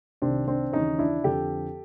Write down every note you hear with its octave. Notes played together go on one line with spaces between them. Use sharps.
C2 C3 D#3 C4 D4
C4 D4
D#2 C#3 E3 C#4 D#4
D4 E4
F2 D3 F3 G4 A4